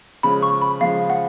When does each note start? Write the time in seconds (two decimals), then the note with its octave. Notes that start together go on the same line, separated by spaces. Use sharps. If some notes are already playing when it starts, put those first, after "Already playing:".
0.23 C#3 F3 G#3 B5
0.42 C#6
0.61 B5
0.81 C#3 F3 G#3 F5
1.10 F#5